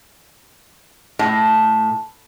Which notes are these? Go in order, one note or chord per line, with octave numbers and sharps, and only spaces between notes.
A2